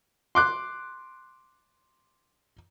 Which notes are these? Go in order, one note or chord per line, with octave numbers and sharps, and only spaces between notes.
C6 D6 F#6